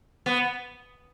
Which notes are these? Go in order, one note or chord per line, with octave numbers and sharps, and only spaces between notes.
B3